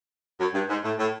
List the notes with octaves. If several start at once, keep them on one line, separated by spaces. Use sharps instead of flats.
F#2
G2
G#2
A2
A2